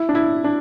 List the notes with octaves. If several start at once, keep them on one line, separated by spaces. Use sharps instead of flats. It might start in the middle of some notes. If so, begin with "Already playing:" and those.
Already playing: E4
D4
E4
D4